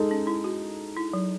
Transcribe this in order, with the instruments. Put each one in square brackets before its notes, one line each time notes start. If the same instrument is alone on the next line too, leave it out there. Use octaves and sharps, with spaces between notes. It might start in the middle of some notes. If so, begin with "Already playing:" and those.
Already playing: [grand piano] G#3 D#4 A4
[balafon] C#4
E4
F#4
E4
F#3